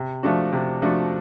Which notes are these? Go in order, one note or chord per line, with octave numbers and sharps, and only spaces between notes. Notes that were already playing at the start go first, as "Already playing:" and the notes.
Already playing: C3
F3 A3 D4 F#4
C3
F3 A3 D4 F#4